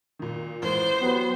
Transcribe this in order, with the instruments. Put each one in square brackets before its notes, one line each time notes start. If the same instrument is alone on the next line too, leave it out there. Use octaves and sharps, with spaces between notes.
[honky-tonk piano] A#2 D#3
[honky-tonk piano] A1 E3 G#3 [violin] C5
[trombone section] F#3 B3 [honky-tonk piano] G4 B5